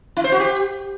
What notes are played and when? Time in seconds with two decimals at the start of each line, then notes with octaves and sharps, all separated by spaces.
0.17 E4
0.24 C5
0.32 F#4
0.40 G4